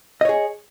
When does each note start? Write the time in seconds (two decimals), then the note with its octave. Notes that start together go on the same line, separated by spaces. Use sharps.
0.21 D#5
0.25 C#5
0.29 G#4